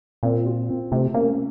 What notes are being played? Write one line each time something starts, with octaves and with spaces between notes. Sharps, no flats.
A#2 C4
F4
C4
C3 A3
A#3 C#4